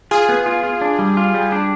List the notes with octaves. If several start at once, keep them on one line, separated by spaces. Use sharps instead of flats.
F4 G#4
B3
F4
F4
D4
G3
F4
G3
D4